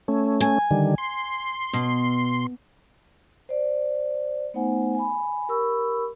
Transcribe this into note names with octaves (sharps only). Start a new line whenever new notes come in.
A3 C#4
G#5
D3 D#3 G3
C6
B2
C5 D5
A3 B3 D#4 C5 F#5 G#5
G#5 B5
G4 A#4 B5 C#6 E6